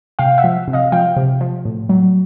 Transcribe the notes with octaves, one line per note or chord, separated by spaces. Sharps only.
C3 F5 G5
E5 F#5
F3
C3
D#5 F5
F3 F5 G5
C3
F3
A2
F#3